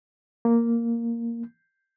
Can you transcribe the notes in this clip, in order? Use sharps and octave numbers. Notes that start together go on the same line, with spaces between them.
A#3